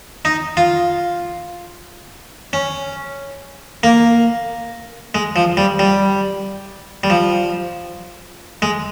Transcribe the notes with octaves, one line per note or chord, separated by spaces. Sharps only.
D#4
F4
C#4
A#3
G#3
F3
G3
G3
G3
F3
G#3